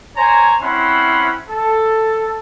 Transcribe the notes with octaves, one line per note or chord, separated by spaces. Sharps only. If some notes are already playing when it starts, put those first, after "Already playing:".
C5 C#5 G#5 A#5
C4 C#4 E4 F#5 B5 C6
A4